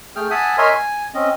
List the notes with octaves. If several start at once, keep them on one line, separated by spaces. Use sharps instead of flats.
A3 G#4 G5 F6
E5 F#5 G#5 A5 D#6
A#4 C#5 D#5 E5 G#5 C6
G#5
C4 C#4 D#5